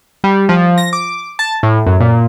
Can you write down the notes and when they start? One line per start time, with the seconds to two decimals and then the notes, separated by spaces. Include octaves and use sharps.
0.24 G3
0.49 F3
0.78 A#6
0.93 D6
1.39 A5
1.63 A2
1.87 F#2
2.00 A#2